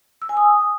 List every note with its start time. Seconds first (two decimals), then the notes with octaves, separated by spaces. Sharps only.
0.22 E6
0.29 G#5
0.37 D#6